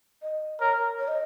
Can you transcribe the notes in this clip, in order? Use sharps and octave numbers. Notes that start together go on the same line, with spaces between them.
D#5
A#4 C#5
C#5
D#5